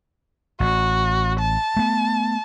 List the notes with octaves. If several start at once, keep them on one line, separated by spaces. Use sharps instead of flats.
A1 F#4
A5
A3 B3